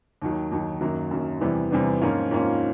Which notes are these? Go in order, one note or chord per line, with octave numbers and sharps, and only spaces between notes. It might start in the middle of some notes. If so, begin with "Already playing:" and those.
D#2 D#3 F#3
D#2 D#3 F#3
F#2 D#3 F#3 A#3
F#2 D#3 F#3 A#3
E2 C3 E3 G3 B3
E2 C3 E3 G3 B3
G#2 F3 A#3 C#4 F4
G#2 F3 A#3 C#4 F4